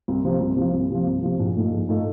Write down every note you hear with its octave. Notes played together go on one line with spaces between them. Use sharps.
C2
C3 F3
C2
C3 F3
C2
C3 F3
C2
C3 F3
A#1
A#2 A3 D#4
A#1
A#2 A3 D#4